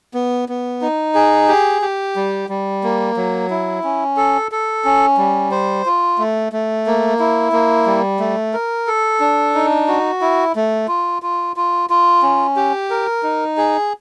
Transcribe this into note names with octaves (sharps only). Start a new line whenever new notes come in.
B3
B3
D#4
G#4
G4
G4
G3
G3
A#3
F#3
E4
C#4
A4
A4
C#4
G3
C5
F4
A3
A3
A#3
E4
A#3
G3
A3
A#4
A4
D4
D#4
F#4
E4
A3
F4
F4
F4
F4
C#4
G4
A#4
D#4
G#4